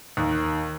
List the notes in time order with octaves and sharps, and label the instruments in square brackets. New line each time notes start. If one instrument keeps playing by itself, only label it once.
[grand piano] D#2